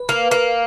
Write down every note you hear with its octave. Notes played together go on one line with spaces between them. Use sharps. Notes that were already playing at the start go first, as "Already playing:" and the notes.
Already playing: B4
A#3
A#3